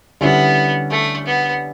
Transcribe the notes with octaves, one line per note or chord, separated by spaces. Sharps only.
D3 G3 B3 C#4 E4
A3
B3